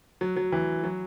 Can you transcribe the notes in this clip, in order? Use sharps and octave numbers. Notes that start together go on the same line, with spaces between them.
F#3
F#3
E3
F#3